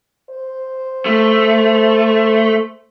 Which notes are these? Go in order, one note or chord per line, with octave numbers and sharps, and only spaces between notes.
C5
A3